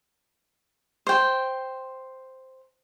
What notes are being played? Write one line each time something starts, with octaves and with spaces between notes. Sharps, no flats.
C5 G5